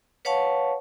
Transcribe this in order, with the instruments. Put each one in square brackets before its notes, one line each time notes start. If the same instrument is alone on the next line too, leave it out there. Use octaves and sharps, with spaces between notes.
[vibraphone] B4 C#5 F5 F#5 A5 C#6